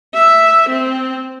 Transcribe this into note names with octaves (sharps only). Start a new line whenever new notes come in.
E5
C4